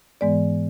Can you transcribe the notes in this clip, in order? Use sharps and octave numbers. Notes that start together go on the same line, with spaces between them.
G#2 E3 G#3 B3 D5